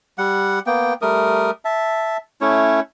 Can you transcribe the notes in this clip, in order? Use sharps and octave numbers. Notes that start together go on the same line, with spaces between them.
G3 F#5
A#3 B3 G5
G3 A3 A#4 D#6
E5 A5
A3 C#4 E4 C#5